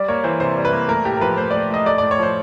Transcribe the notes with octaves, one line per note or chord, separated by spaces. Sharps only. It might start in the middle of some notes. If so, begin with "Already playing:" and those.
Already playing: G3 D5
A#3 C#5
E3 C5
C3 C5
G3
B4
A#3
A3 A#4
A2 G4
A#4
F3 B4
A2 C5
D5
A3
A2 D#5
A3 D5
D5
A2
C#5
F3 C5